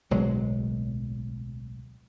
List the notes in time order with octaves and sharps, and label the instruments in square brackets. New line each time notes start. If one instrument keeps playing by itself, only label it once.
[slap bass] D1 B1 F#3 G#3